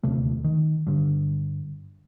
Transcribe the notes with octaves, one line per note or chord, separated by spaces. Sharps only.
D#1 D2 C3 A3
D#3
G2 D3